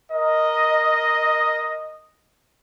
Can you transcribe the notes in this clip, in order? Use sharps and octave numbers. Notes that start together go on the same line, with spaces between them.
A#4 D#5